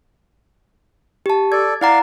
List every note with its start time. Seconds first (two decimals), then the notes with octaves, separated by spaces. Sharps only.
1.26 G4 A5
1.52 A4 D5 G#6
1.81 E4 D5 F5 F#5 A#5